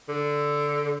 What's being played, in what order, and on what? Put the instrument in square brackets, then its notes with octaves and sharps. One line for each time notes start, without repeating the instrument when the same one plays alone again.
[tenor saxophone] D3